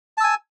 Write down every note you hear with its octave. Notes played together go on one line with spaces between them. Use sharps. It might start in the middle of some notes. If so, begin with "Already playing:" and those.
G#5 A5 E6